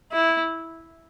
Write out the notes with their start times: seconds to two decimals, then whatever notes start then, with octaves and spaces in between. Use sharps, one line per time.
0.12 E4